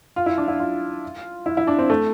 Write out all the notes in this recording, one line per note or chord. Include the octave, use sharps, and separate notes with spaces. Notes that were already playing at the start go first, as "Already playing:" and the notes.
F4
E4
D4
E4
F4
E4
E4
D4
C4
A3